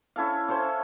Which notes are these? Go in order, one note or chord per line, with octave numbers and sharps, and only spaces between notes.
C#4 E4 A4 F5
C#4 A4 C5